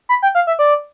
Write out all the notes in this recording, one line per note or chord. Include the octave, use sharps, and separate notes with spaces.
B5
G5
F5
E5
D5